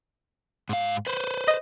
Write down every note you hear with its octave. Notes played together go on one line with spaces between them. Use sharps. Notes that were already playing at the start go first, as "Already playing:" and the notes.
G#2 F5
B4 C5
D#5